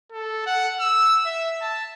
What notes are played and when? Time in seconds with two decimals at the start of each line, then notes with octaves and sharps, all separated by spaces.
0.12 A4
0.46 F#5
0.80 E6
1.26 E5
1.62 A5